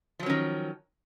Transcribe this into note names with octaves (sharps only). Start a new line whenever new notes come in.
D#3 F3 F#3 C#4